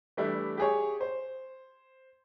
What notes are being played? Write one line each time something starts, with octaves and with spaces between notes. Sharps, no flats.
E3 G3 A3 D4 E4 G4
G4 G#4 C#5
C5